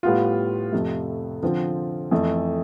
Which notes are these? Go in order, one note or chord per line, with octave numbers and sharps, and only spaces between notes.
A2 G3 B3 F4
F2 C3 F3 A3
D3 F3 C4 F4
F2 E3 A3